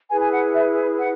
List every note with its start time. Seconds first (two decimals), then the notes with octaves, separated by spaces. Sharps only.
0.10 E4 G#4 B4 G#5
0.21 G#5
0.32 F#5
0.55 E5
0.99 F#5